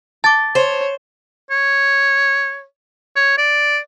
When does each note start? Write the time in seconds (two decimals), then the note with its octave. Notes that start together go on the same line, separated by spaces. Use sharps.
0.24 A5 D6 A6
0.55 C5 C#5
1.51 C#5
3.16 C#5
3.38 D5